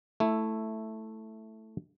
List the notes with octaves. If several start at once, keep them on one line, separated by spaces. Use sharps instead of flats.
A3 E4